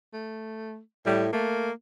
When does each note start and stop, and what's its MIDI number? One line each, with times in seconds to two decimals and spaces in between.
0.13 0.80 57
1.06 1.30 45
1.06 1.26 55
1.33 1.70 57
1.33 1.72 58